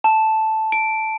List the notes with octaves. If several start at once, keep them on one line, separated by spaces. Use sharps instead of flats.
A5
D7